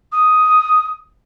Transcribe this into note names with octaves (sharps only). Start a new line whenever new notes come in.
D#6